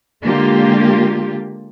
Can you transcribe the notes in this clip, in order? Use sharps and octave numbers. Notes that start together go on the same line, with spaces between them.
D3 G#3 A#3 F4 G4